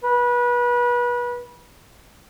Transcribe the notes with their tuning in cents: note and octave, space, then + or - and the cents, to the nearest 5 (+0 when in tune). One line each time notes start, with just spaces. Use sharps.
B4 -30